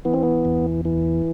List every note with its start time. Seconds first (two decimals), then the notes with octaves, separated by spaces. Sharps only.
0.05 E3 B3
0.14 C4
0.23 B3
0.45 E2
0.85 E3